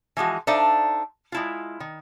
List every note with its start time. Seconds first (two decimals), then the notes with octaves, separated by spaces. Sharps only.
0.17 E3 F3 G#3 F#4
0.47 D4 D#4 A4 C5 E5 F5
1.32 G#3 E4 F4
1.80 D#3